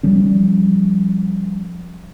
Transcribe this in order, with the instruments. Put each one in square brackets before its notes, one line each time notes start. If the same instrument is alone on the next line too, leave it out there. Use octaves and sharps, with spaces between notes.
[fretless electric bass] F3 G3 C#4